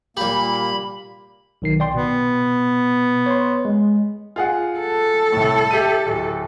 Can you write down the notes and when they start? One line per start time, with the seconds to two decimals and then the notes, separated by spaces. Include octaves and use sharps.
0.17 A#2 G3 A#3 G4 B5
1.62 B1 D#3 C7
1.80 D5 G5 C6
1.94 B2 B3
3.26 C#5 C6
3.65 G#3
4.36 F4 G#4 F#5
4.79 A4
5.32 C2 A2
5.71 G4 E5 D#7
6.06 D1